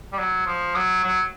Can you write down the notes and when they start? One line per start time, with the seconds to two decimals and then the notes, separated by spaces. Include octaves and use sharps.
0.13 G3
0.19 F#3
0.47 F3
0.75 F#3
1.04 F#3